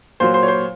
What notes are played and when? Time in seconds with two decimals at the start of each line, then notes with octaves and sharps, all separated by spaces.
0.20 A#2 F#3 C5
0.34 C5
0.43 C#5
0.48 C5